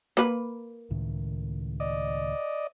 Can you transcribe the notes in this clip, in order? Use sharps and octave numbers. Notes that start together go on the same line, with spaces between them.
A#3 B4
C#2 A2 D#3
D5 D#5